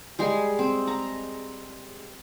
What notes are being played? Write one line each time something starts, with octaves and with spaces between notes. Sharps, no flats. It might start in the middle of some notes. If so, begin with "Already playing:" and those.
G3 G#3 G#4 G#5
C4
A#5